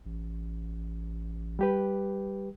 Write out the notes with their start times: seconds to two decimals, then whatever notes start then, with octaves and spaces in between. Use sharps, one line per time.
0.06 A1
1.59 G3 G4 B4